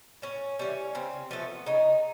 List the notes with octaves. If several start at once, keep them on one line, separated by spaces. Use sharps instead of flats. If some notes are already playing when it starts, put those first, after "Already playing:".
A2 C#4
E3 G3 C#4
C#3 C4
F3 A3 B3
C#3 D#4